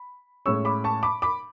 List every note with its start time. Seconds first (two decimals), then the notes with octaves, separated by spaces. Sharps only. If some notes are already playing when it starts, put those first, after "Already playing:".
Already playing: B5
0.46 A2 G#3 C#4 C#6 E6
0.65 B5 D6
0.84 A5 C#6
1.03 B5 D6
1.22 B5 D6